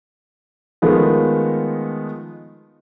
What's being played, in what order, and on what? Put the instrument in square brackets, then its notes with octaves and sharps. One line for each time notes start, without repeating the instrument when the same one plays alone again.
[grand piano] D#3 F3 G#3 A3 B3